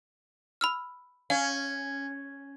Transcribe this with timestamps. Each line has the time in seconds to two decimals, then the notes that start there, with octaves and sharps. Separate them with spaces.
0.61 B5 E6 F6
1.30 C#4 F5